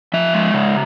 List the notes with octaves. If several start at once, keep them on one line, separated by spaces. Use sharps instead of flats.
F3 E5
G#3
C#3